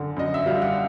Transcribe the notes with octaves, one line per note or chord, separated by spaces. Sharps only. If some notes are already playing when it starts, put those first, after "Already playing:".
Already playing: F#2 D3
F#2 D#5
E5
G3 F5
F#5